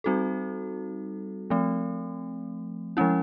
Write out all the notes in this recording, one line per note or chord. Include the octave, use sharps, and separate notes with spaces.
G3 C4 D#4 F#4 A4
F3 A3 C4
F3 G#3 C#4 E4